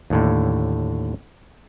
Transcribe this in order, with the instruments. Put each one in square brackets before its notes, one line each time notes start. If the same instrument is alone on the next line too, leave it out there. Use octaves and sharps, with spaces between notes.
[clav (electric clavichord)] D#2 A2 D3